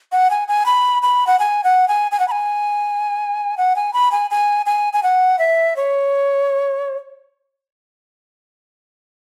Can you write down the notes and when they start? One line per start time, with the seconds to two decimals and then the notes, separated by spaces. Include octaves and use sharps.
0.12 F#5
0.30 G#5
0.48 G#5
0.66 B5
1.03 B5
1.27 F#5
1.39 G#5
1.64 F#5
1.88 G#5
2.12 G#5
2.20 F#5
2.28 B5
2.31 G#5
3.57 F#5
3.76 G#5
3.93 B5
4.11 G#5
4.31 G#5
4.66 G#5
4.93 G#5
5.03 F#5
5.39 E5
5.76 C#5